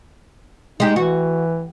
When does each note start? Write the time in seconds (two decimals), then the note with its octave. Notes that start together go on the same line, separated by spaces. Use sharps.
0.80 G#3 D#4 G4
0.96 E3 F#4